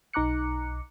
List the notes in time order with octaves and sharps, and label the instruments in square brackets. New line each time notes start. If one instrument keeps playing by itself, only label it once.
[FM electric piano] B1 D#4 A#5 D6 F#6 C#7